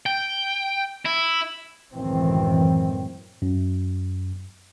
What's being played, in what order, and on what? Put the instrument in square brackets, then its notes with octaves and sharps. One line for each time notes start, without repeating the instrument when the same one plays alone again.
[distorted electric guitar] G5
E4
[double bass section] C#2 F#2 A2 D#3 E3 C4
[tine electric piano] F#2